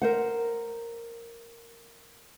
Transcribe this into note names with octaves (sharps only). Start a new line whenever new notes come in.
A#4 C5 F#5